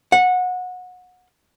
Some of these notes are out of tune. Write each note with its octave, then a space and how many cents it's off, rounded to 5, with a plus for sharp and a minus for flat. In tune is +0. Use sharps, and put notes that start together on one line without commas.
F#5 -25